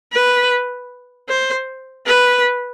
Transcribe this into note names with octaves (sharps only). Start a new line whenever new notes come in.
B4
C5
B4